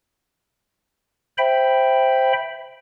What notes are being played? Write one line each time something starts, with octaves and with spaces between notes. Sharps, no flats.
C5 E5 G5 B5